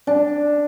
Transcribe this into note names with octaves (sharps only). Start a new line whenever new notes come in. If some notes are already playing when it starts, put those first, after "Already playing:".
D4